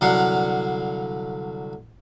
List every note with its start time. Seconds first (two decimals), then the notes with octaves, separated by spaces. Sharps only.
0.01 C2 D3 F#3 F5 F#5